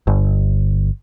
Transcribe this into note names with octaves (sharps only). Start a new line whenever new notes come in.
G1